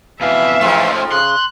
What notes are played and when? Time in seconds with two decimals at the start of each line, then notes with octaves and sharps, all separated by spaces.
0.21 F2 B2 E3 E5 F5
0.61 F2 G#2 F3 A3 C#4
1.12 C#3 C6 F#6